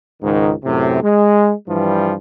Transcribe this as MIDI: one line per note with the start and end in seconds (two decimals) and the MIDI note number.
0.22 0.52 37
0.22 0.52 44
0.22 0.52 51
0.64 0.99 42
0.64 0.99 45
0.64 0.99 48
1.02 1.52 56
1.67 2.14 43
1.67 2.14 52
1.67 2.14 53
1.67 2.14 55